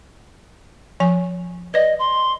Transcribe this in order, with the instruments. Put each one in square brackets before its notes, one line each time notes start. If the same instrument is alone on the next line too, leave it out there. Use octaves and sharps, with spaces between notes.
[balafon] F3 G#5
[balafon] B4 D5 [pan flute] D#5
[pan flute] C6